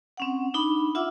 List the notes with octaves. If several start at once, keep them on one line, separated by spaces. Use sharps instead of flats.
C4 C#4 F#5
D4 D#4 B5
F4 E5 F#5 D6 E6